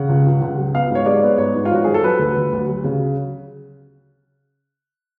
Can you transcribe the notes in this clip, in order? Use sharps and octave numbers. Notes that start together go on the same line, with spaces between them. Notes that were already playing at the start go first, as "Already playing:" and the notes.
Already playing: C#3 F#5
C#2
C#2
C#2
F#3
B3 F5
G#2 C#5
G#3 D5
B3
G#2 C#5
G#2
F4
F3 F#4
F3 G#4
A4
F#3 B4
D2
D2
D2
F#3
C#3